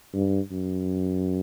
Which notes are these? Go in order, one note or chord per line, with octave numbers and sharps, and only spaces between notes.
G2
F#2